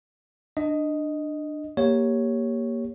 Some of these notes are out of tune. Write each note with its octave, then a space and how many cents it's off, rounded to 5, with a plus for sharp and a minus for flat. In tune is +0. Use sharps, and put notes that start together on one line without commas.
D4 +20 D#5 +0
A#3 +5 G4 +10 C#5 +0